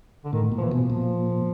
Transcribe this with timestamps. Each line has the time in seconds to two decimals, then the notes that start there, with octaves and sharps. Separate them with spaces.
0.25 D3
0.33 A2 D#3
0.52 A#2
0.58 F3
0.61 E3
0.72 B2
0.90 A#2 F3